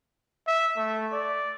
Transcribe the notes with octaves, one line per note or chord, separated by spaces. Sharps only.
E5
A3
D5